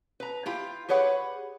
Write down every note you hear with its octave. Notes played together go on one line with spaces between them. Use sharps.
B4 A#5
E4 F4 G4
G4 G#4 B4 C#5 F#5